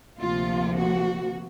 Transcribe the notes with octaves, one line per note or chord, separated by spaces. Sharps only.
D2 C3 F3 A#3 F4
F#4